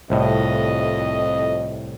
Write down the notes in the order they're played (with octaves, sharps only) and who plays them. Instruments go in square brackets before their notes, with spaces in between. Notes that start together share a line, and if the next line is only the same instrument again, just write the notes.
[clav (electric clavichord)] C2 A2 [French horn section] F2 D#5